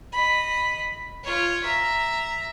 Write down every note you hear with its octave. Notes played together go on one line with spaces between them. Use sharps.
D#5 B5
F4 C#5
E5 A#5